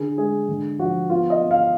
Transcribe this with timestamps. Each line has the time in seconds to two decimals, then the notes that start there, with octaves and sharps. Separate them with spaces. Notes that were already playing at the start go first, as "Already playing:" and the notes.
Already playing: D3 G#4
0.17 G#3 G#4
0.49 D3
0.79 F3 F#4
1.09 B3 F4
1.30 D#5
1.41 B3
1.51 F5